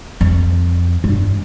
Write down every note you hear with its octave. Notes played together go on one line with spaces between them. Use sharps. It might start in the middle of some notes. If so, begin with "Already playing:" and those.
F2
G2